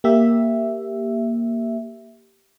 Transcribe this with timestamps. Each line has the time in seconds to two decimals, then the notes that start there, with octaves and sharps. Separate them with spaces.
0.04 A#3 G4 E5